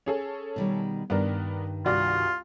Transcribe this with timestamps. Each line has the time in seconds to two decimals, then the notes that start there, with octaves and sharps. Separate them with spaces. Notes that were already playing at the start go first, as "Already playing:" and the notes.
0.06 C#4 G#4 A4
0.56 B2 D#3 G3
1.10 G2 D#3 B3 D4 A#4
1.86 C2 F4 F#4 D5